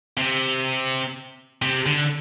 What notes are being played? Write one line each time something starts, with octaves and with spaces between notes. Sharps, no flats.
C3
C3
D3